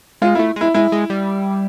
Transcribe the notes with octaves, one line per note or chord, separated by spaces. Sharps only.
G#3 F4
A3 E4
G#3 E4
G#3 E4
G#3
G3